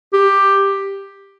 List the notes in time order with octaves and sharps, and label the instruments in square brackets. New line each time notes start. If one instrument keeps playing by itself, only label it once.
[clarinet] G4